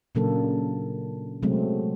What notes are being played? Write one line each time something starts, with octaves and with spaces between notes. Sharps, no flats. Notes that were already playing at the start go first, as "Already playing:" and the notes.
A#2 C#3 F#3 A#3 D4 A4
C3 F#3 G#3 A3 C4